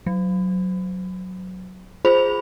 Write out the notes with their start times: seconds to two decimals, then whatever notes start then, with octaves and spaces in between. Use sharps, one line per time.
0.06 F#3
2.05 F4 G#4 C5 B5 F7